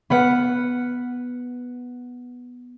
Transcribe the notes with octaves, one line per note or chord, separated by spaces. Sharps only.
B3 B4 F#5 F6